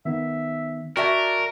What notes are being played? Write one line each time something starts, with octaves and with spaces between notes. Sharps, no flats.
D#3 B3 D#4 E5
F#4 A#4 D5 E5 G5 A5 G#6